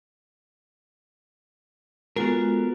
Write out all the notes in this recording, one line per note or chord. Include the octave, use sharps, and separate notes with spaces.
G#3 B3 F4 F#4 A4 A#4